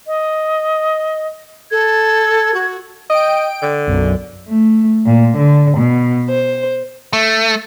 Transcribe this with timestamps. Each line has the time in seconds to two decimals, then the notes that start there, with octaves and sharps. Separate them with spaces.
0.07 D#5
1.71 A4 G#6
2.54 F#4
3.10 D#5 G5 D7
3.62 D3
3.87 B1 F#2
4.48 A3
5.06 A#2
5.38 D3
5.77 B2
6.29 C5
7.13 A3